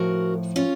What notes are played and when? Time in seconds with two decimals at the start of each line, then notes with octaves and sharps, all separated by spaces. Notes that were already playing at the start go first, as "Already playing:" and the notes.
Already playing: A2 F3 F#4 A#4
0.56 C#4 F4